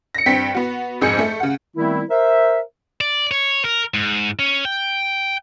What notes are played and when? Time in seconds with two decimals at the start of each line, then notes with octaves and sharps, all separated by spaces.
0.15 A#6 C#7
0.26 G2 C4 G5 B6
0.54 B3 F#4
1.01 A#1 F2 G#2 G#4 G6 C#7
1.18 A3
1.40 C#3 F#5
1.77 D#3 G3 A3 B3 C4 E4
2.10 A#4 C5 E5
3.01 D5
3.31 C#5
3.64 A#4
3.94 G#2
4.39 C#4
4.65 G5